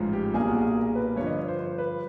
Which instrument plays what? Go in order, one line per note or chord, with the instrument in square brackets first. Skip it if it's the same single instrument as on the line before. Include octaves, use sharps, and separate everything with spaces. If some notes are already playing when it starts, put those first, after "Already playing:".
Already playing: [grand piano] A1 G#2 F3
G4
B1 A#2 G3 A#3 G#4
F#4
G#4
A#4
B4
G2 D3 F3 C#5
D#5
C#5
C5
C5
B4